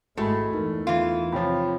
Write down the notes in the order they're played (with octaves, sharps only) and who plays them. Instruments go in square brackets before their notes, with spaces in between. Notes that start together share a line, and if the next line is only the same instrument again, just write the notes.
[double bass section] G#1 G#3 [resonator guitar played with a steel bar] A2 [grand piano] A3 [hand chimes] F#4 A4 B5
[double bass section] E2 [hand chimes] D#4 A#4
[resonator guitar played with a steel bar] E3 F4
[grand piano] C3 F3 [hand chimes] C#5 G5 B5